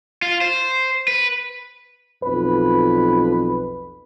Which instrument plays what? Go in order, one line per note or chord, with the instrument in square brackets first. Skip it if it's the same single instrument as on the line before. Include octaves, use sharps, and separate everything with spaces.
[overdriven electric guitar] F4
C5
B4
[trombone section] B1 F2 B4